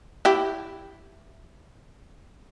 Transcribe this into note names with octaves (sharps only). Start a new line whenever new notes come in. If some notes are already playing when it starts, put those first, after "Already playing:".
E4 G4